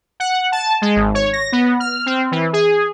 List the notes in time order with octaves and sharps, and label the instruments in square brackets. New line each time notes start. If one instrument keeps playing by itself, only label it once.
[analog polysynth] F#5
A5
G#3
G#1
C#5
A#6
B3
F6
C4
E3
G#4